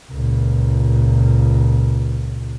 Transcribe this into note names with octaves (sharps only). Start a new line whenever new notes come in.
C#2 A#2